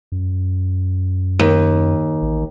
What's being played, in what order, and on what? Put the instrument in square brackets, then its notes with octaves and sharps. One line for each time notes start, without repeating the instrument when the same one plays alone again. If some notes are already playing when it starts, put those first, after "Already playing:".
[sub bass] F#2
[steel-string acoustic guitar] D#2
[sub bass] A1